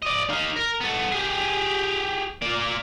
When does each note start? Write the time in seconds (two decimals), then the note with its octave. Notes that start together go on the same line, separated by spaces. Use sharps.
0.02 D5 D#5
0.30 D#4 F5
0.57 A#4
0.81 B3 A4
1.12 G4 G#4
2.42 A#3 D5